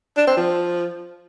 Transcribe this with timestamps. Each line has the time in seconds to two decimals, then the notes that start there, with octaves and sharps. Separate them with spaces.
0.17 D4
0.27 C4
0.37 F3